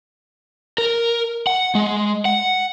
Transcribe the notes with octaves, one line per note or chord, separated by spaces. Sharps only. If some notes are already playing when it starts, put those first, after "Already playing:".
A#4
F#5
G#3
F#5